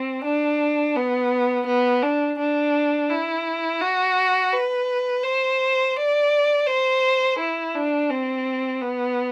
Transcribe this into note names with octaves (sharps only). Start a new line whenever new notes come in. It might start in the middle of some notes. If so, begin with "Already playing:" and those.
Already playing: C4
D4
B3
B3
D4
D4
E4
F#4
B4
C5
D5
C5
E4
D4
C4
B3